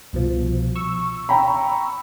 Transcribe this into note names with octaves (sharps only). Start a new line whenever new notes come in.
C2 B2 F3
C#6 E6
G5 A#5 B5